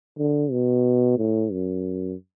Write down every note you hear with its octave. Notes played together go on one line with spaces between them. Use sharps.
D3
B2
A2
F#2